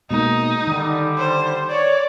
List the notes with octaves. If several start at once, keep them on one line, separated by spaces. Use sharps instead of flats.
B2 G#3 A#3 D#4
D3 D#3 G3
C5
C#5 D5